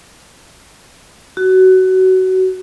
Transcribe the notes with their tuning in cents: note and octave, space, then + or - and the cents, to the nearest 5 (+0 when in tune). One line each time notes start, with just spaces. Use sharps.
F#4 +20